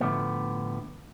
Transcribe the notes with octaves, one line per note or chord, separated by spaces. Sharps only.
A2 D3 D#3 F3 A3 B3